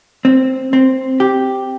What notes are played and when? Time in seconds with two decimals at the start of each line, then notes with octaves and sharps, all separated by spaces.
0.25 C4
0.73 C4
1.20 G4